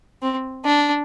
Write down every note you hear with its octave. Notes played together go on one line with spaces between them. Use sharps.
C4
D4